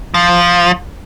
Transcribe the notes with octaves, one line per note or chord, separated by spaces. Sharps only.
F3